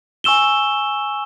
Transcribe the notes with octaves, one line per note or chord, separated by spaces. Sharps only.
G#5 C#6 E6 E7 G7